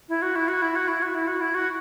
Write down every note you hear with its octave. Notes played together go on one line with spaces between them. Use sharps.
E4
F#4
E4
F#4
E4
F#4
E4
F#4
E4
F#4
E4
F#4